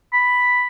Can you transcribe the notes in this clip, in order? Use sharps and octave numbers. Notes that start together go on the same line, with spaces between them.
B5